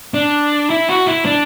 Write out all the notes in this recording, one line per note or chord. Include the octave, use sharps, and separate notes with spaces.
D4
E4
F#4
E4
D4